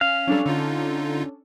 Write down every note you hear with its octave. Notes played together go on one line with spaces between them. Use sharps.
C#4 F5
F#3 G3 C#4 D4 A4
D3 D#4 F4